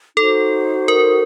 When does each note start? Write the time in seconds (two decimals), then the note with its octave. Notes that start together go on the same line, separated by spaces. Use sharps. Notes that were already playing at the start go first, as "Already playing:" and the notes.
0.16 D#4 F#4 A4 C5
0.88 A#4